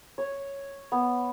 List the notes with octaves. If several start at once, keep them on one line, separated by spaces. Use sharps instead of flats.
C#5
B3